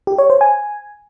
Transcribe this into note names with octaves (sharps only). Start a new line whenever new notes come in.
G4
C#5
C5
G#5